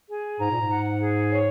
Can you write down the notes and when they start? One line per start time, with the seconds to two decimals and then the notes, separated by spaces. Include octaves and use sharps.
0.09 G#4
0.40 G#2 A#5
0.51 A#2
0.61 G#2
0.69 F#5
1.00 G#4
1.30 C#5